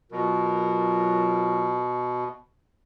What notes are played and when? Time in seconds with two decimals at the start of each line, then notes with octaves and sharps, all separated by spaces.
0.12 B2 F#3 F4 A#4